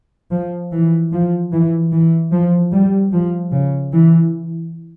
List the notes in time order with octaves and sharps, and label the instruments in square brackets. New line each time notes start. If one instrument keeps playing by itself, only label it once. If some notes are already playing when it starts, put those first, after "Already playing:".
[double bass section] F3
E3
F3
E3
E3
F3
G3
F3
C#3
E3